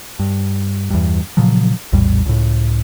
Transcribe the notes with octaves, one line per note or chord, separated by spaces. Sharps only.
G2
E2 G2
A#2 C#3 F3 F#3
A#1 E2 A2 G3
C#2 A2